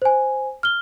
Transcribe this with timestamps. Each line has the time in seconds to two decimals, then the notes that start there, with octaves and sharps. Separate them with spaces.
0.02 C5 G#5
0.63 F6 G7